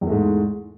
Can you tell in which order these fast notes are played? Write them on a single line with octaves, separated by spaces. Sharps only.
E2 E3 A3 G#3 G#2